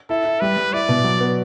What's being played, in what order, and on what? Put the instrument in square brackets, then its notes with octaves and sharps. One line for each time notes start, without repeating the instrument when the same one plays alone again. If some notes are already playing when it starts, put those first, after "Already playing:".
[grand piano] E4 [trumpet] A4
[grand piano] E4
[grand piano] G3 [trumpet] B4
[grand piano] G3
[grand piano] E4 [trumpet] D5
[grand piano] B2
F#3
B3